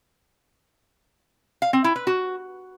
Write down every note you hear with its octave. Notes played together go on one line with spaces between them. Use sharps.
F5
C4
E4
B4
F#4